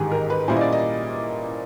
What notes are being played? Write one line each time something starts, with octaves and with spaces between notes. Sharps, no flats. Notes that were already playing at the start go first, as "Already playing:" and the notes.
Already playing: A1 G#2 D#3 G4 G#4
A#4
B4
A#2 G3 A#3 C#4 E4 C5
D#5
D5
D#5